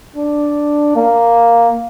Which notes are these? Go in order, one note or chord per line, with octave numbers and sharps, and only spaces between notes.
D4
A#3